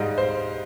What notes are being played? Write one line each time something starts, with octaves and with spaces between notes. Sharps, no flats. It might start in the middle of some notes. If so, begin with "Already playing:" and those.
Already playing: G#2 G3 D#5 F5
C5